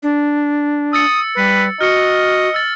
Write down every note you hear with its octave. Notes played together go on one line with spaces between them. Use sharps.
D4
D#6 E6 A6 C#7
G3 B4
F#4 D#5 F6 C#7
E6 A6